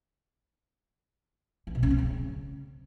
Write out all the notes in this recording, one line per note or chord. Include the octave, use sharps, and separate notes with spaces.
E3
B2
C#4
C4
C#3